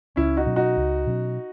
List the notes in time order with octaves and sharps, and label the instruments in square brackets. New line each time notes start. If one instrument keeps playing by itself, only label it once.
[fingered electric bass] C#2 [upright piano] C#4 E4
[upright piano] D#4 F#4
[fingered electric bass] B2 F#3 C#4
[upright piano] D#4 F#4
[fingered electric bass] C#2
B2 F#3 C#4